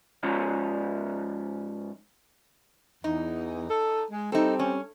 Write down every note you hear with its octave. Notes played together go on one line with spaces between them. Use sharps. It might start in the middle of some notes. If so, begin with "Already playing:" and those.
G#2 F3 C#4
E2 D#4
A4
G#3
G3 C4 D#4 A4
C#4